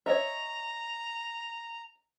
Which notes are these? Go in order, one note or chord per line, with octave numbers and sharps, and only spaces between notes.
C#5 D#5 E5 A#5